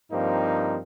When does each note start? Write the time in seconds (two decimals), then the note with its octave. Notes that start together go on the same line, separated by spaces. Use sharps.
0.12 G2 F3 A#3 C4 D#4